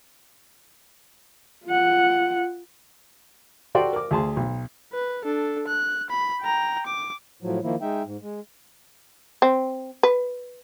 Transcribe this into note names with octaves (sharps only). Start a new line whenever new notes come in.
F4 F#5
F#4 G4 A4 D5 G5 C6
A#4 D6
D2 G#4 A5 C6
B1
B4
D4 A4
F#6
B5
G5 A#5
D6
A2 F3 F#3
D#3 F3 A#3 E4
G#3 D#4 E5 G5
G#2
G#3
C4
B4